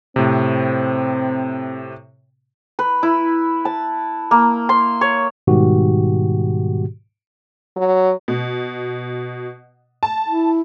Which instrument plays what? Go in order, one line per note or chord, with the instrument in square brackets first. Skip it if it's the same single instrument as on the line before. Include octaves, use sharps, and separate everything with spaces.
[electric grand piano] A2 C3 [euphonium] C4
[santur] B4
E4
A5
A#3
C6
C#5
[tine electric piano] G#2 B2 D#3 G3 F#4 G4
[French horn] F#3
[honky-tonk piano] B2
A5
[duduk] E4